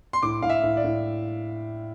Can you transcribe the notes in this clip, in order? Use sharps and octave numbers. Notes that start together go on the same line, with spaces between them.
C6
A2 D6
A2 F5
E5
A2
D5
A2